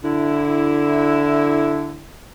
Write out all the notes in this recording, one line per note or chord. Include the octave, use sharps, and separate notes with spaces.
D3 E4